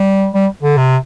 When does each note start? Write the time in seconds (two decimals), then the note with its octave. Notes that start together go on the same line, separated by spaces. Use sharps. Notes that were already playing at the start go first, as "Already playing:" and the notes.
Already playing: G3
0.34 G3
0.63 D3
0.77 C3